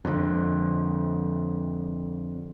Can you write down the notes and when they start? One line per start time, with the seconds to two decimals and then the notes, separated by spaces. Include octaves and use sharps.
0.05 F2 D3